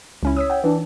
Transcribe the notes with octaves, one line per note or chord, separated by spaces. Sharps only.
C#2 C#4 E4
C#5 D#6 E6 B6
F#5 G5
E3 D4